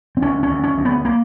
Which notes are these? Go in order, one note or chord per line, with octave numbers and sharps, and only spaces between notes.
C4
D2 C#4
C#4
D2
C#4
D2
B3
A#3